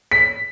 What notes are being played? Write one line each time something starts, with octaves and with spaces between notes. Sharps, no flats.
B6